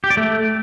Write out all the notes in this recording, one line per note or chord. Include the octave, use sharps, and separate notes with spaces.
G4
D5
A3